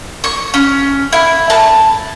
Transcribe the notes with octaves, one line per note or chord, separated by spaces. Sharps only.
C#6
C#4
E4
A5